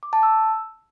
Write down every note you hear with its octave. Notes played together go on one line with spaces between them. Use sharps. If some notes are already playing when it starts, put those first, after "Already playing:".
D6
A5
E6